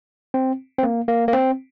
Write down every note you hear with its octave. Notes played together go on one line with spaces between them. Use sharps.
C4
C4
A#3
A#3
A#3
C4